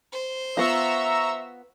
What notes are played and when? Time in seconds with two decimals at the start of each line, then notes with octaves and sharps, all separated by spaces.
0.13 C5
0.57 B3 F4 E5 A#5 C#6 E6